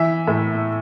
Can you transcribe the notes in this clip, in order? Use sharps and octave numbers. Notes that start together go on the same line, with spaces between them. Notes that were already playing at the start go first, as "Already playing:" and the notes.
Already playing: E3 E5
A2